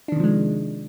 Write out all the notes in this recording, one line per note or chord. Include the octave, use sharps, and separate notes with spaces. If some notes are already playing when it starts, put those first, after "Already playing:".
C3 D#3 F3 G#3 D4